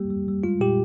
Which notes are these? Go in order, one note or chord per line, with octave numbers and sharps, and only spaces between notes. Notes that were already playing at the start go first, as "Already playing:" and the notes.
Already playing: G3 A#3 G4
G3
G3
G#3 F4
A#2 G4